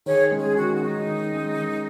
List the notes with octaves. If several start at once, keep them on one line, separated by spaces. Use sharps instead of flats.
D#3 G#4 C#5
G#3 C#4
G#4
D#3 F#4
F#4
G#3 C#4 D#4
D#3
G#3 C#4
D#3